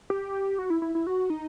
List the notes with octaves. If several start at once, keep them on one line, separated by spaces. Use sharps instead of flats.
G4
F#4
E4
E4
E4
F#4
D#4